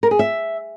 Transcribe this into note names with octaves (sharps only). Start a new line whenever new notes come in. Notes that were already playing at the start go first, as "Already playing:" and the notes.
A#4
G#4
E5